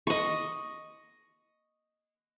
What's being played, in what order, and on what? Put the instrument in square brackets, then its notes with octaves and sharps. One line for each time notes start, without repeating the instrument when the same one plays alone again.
[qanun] D#5 C#6